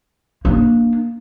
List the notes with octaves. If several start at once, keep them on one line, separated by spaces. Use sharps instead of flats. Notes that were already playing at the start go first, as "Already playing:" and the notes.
A#3 D4